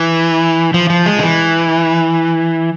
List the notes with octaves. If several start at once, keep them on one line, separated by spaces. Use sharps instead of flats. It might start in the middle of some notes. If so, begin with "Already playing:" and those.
Already playing: E3
F3
F3
G#3
D3
E3